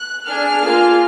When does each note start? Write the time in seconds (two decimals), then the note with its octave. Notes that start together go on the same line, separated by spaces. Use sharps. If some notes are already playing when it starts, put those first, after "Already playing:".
Already playing: F#6
0.26 D4 G#4 F6
0.62 A#3 F4 G#4